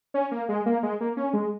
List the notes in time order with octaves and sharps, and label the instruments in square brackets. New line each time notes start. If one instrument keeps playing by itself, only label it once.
[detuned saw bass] C#4
A#3
G#3
A#3
G#3
A#3
C#4
G#3